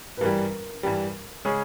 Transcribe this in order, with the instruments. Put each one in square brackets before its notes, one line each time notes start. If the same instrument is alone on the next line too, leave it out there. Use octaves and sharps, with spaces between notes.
[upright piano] B4
[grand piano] G2 E3 G3 [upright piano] A#4
[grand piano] G2 E3 G3
C#3 G#3 C#4 G#4